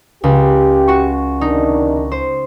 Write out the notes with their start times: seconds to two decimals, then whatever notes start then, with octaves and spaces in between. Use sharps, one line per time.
0.24 C#2 G4
0.88 F#4 C#6
1.41 C3 D#3 D4 D#4
2.12 C5